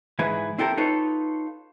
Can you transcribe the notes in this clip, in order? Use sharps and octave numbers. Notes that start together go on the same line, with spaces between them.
G#2 E3 E4 G#4 B4
C4 E4 G4 A4 A#4
D#4 F4 A4 B4 C#5